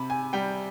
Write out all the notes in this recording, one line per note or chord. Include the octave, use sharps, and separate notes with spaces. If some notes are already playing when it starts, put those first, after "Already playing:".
Already playing: C3 B5
G#5
G3 G5